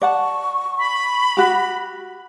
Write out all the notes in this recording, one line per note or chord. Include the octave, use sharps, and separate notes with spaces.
D5 F#5 A5 C#6
B5
F#4 G4